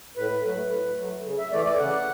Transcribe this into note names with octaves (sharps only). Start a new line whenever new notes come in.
A2 B4
F#3 A3
A2
F#3 A3
C#3
E5
E3 A3 D5
D5
C#3 F#5